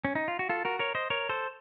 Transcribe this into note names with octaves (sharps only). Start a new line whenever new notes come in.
C#4
D#4
F4
F#4
F4 A4
F#4 A#4
A#4 C#5
C5 D#5
A#4 C#5
A4 C5